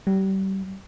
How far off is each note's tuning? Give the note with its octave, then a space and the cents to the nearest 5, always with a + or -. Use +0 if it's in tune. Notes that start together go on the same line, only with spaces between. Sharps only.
G3 -30